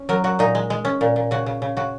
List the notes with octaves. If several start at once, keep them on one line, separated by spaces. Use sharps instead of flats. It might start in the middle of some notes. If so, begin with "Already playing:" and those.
Already playing: C#4
F#3 A#4
F#3 F#4
A#2 D#4
G#3
G#3
C#4
A#2
A#2
C#3 F#4
C#3
C#3
C#3 F#4